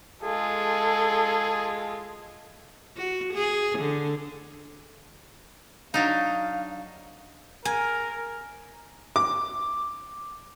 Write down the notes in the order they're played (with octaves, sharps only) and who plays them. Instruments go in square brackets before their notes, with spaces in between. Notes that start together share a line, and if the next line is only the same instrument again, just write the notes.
[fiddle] G#3 F4 [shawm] G#4 [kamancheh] A4
[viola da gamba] F#4
G#4
D3
[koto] F#3 D4 D#4 [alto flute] F5
[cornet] A#4 [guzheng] G#5
[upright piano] D6